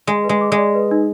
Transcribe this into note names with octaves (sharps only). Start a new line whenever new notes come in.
G#3 G#5
B4
G#3
D6
G#3
D5
B4
D#4